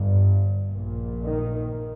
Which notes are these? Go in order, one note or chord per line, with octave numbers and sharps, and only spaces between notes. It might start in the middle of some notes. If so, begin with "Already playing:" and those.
Already playing: G1 G2
A#1 A#2
D#3